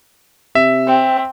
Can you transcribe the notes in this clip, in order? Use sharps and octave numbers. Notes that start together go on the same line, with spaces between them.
C3 E5
C4